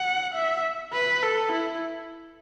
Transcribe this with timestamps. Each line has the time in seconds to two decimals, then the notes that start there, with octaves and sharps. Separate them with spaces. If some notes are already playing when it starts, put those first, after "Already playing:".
Already playing: F#5
0.35 E5
0.93 B4
1.23 A4
1.52 E4